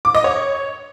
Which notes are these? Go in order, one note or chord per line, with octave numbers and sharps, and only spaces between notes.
D6
D#5
C#5